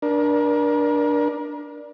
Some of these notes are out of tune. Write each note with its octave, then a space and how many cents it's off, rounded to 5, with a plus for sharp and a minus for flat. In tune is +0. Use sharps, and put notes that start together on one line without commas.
D4 +0 A#4 +35